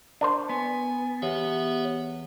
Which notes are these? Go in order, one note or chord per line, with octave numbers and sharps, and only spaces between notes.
D4 A#4 C5
B3 G#5
E2 B3 G4 C#5 E5